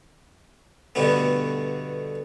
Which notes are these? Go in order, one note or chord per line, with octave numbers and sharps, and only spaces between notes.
G2 B2 D3 A3 B3